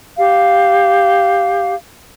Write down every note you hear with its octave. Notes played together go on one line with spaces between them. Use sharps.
G4 F5